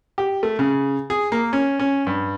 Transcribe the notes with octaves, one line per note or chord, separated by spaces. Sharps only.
G4
A3
C#3
G#4
A#3
C#4
C#4
G2